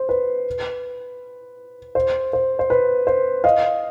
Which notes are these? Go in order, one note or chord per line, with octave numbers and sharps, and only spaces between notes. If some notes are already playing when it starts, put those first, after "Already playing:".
Already playing: C5
B4
C5
C5
C5
B4
C5
D#5 F5